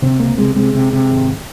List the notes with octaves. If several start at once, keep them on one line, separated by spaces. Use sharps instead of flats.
C3 C4
C#2 A#3
C3 G#3
C3 G#3
C3
C3
G#1